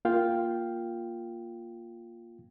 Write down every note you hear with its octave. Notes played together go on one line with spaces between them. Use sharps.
A#3 F4 F5 G5